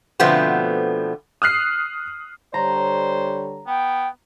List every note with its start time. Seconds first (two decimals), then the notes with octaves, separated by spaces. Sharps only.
0.19 B2 D3 F3 A3 B3 C4
1.42 D#6 F6 F#6 C7
2.54 D3 G3 C5 C#5 A#5
3.67 B3 G5